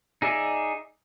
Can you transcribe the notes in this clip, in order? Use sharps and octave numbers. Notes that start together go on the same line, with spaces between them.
D#4 G#4 D5 E5